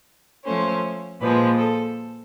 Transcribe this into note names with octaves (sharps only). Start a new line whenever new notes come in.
F3 A3 C#4 C5
A#2 F3 G#3 B4
A4